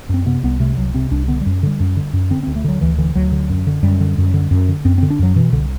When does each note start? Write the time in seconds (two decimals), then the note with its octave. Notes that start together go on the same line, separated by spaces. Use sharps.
0.09 F#2 C4
0.26 C3 B3
0.43 C2 B3
0.60 C3 A3
0.77 C2 F#3
0.94 C3 C4
1.11 C2 D4
1.28 D3 B3
1.41 G3
1.46 F#2
1.63 D3 G3
1.80 F#2
1.97 D3
2.13 F#2
2.31 D3 C4
2.43 D2 C4
2.56 A3
2.64 D3 F#3
2.81 D2 E3
2.98 D3 E3
3.15 D2 F#3
3.32 D3
3.50 F#2
3.67 D3
3.83 F#2 G3
4.01 D3
4.18 F#2
4.34 D3
4.51 F#2
4.69 D3
4.85 F#2 C4
4.98 C4
5.03 D3
5.10 D4
5.19 F#2 F#3
5.36 B2 E3
5.53 C2 D3